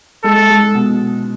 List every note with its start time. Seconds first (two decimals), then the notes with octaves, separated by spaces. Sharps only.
0.24 G#3 A4
0.50 G#3
0.75 B2